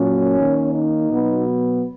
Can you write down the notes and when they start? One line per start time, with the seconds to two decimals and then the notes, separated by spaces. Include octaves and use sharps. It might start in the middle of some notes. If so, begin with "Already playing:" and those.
Already playing: A#2 F#3 A#3 C#4
0.37 D#3 A#3
0.74 D#4
1.11 B2 F#3 B3